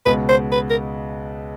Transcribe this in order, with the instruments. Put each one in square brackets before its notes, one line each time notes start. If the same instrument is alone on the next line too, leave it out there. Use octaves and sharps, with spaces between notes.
[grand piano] C#2 B2 G#3 B3 [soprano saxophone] B4
[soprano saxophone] C5
B4
A#4